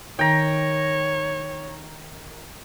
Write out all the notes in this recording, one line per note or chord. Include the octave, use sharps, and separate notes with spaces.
D#3 C#5 G5 A#5